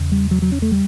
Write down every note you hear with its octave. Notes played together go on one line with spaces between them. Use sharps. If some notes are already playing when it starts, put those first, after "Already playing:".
Already playing: E2 C#3
G3
F#3
F#3
C#4
A3
G3